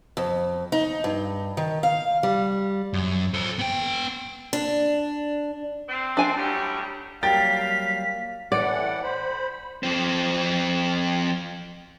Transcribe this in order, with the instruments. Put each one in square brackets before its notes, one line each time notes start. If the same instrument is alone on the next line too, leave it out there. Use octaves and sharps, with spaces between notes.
[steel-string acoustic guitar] F2
D#4
G2
D#3
F5
G3
[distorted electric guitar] F#2
A4 C5
B3 G5
[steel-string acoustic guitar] D4
[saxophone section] C4
[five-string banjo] D4 G#5 A5
[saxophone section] A2 F#3 G3
[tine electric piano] F#3 G3 A#3 [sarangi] F5 [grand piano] G5 A6 [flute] B6
[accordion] A2 E3 F#5 [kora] D5
[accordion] C5 B5
[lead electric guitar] F2 C4